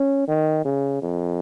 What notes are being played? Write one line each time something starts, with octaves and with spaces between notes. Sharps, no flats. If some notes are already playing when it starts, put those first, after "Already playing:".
Already playing: C#4
D#3
C#3
F2